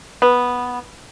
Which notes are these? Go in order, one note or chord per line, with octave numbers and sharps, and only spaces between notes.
B3